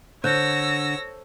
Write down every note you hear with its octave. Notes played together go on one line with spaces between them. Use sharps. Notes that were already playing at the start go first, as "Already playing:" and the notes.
D3 C5 C#5 E6 F#6 G6 A#6